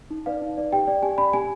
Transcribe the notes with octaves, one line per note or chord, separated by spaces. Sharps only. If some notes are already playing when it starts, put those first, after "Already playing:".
D#4
B4 D5 F5
D#4
B4 D5
G4 G5
D5
G4 G#5
D5 B5
G4 G#5